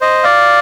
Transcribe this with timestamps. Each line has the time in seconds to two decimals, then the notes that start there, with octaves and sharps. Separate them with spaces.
0.01 C5 D#5
0.24 D5 F5